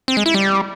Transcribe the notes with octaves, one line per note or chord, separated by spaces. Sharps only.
C4
G#3
E4
G3